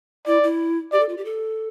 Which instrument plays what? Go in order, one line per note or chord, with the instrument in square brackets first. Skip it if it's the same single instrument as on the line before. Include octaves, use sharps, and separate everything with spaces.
[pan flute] E4 [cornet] D5
[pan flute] E4
[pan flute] G4 [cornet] D5
[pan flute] A4
F4
G4
A4